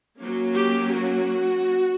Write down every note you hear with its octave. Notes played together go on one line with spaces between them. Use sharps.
F#3 A#3 C#4
G4
F#4